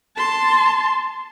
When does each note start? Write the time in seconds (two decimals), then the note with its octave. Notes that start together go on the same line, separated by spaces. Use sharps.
0.17 A5 C6